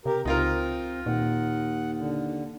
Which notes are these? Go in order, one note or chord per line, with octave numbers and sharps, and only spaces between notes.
C3 G4 A#4
C#2 C4 D#4 F4 A#4
D#2 A#2 F#5
D3